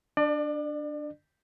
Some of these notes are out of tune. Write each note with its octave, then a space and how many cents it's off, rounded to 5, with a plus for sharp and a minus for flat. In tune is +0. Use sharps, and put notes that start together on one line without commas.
D4 +0 D5 +35